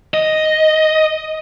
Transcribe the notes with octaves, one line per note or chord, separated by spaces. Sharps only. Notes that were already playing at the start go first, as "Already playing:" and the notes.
D#5